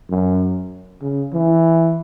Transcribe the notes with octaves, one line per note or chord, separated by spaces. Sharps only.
F#2
C#3
E3